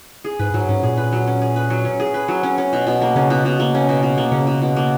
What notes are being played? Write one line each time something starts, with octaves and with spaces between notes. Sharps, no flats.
G#4
G#2 B4
G#2 F#3
G#2 C#4
A#2 G#4
B4
F#3
C#4
G#4
B4
F#3
C#4
G#4
B4
F#3
C#4
C#4
B2
B2
A#3
C#3 C#4
B2
B2
A#3
C#4
B2
B2
A#3
C#3 C#4
B2
B2
A#3